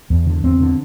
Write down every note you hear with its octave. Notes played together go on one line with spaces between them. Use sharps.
E2
D3
E2 C4
D3